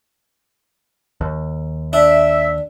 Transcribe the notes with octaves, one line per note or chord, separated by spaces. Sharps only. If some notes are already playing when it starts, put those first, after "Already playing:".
D#2
D4 E5